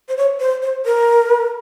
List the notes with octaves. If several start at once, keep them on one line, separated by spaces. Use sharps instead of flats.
C5
C#5
C5
C5
A#4